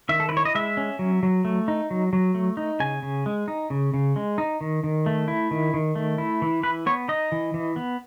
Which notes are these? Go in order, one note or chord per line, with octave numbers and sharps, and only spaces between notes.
D#3 E5
A4
B4
E4 C#5
D#5
G#3 E5
C#4
F#3
F#3
A3
D#4
F#3
F#3
A3
D#4
C#3 G#5
C#3
G#3
D#4
C#3
C#3
G#3
D#4
D#3
D#3
A3
E4
D#3
D#3
A3
E4
E3
E3 B4
B3 C#5
D#4 D#5
E3
E3
B3